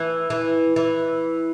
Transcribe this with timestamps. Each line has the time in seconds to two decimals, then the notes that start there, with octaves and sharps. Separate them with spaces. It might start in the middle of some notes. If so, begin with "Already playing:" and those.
Already playing: E3
0.30 E3
0.76 E3